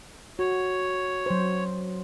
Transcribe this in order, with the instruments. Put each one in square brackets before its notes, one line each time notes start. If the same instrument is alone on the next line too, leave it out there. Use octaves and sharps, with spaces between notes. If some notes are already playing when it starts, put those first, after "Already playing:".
[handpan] F#4 [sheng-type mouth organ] C#5
[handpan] F#3 C5